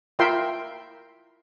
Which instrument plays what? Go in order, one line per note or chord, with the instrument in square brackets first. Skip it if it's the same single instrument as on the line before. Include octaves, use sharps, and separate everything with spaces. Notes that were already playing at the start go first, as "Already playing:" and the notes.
[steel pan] E4 F4 A#4 E5 G5 C6